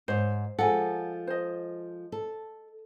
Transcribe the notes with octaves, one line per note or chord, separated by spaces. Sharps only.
G#2 C5 C#5
F3 G#3 A4 F#5 G#5
C5 D#5
A4